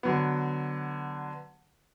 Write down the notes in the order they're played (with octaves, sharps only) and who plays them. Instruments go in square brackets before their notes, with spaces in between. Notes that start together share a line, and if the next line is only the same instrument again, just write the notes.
[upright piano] D3 F#3 B3